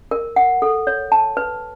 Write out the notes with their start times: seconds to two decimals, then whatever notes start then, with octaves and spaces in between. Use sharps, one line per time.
0.11 A#4
0.36 F#5
0.62 A4
0.87 C#5
1.12 A5
1.37 B4